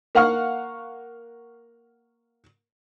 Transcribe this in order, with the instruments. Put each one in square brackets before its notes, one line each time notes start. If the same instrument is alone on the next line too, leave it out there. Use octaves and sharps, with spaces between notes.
[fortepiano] A#3 F5 F#5 C#6 F6